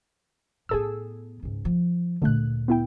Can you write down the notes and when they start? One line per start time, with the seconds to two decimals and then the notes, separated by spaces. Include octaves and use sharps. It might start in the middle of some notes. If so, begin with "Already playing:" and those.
0.69 A2 B3 G#4 A4 E6
1.42 C#2 G#2
1.65 F3
2.22 D2 A#2 D3 A3 F#6
2.68 B3 E4 G5